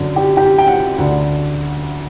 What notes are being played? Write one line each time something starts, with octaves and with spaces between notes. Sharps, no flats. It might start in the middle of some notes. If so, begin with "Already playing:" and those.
Already playing: F#2 D3
G4
G4
G5
F#5
D2 D3 F#5